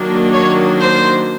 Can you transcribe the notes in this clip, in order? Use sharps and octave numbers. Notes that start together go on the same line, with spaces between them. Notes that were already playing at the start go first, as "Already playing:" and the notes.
Already playing: D#3 F#3 A#3 D4
C#5
C5